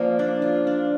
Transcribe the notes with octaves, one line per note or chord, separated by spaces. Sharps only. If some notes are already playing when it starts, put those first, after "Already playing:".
Already playing: F3 A#3 C#4 D5 F5
D4
F4
D4